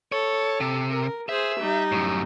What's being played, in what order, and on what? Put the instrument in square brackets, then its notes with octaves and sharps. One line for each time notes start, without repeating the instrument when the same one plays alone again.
[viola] A4 [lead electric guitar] C#5
[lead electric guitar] C3
[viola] A#4
[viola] G#4 C5 [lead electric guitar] E5
[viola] G3 D#4
[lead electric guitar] F#2 A2